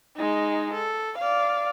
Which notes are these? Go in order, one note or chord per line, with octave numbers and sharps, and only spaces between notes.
G#3 D#4
A4
D5 F5